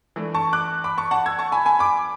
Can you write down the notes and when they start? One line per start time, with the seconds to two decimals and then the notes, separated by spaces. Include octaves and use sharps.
0.16 E3 A3 D4
0.34 A5 C#6
0.53 D6 F#6
0.84 B5 D6
0.97 A5 C#6
1.11 F#5 A5
1.26 E6 G#6
1.39 A5 C#6
1.52 G#5 B5
1.66 G#5 B5
1.79 B5 D6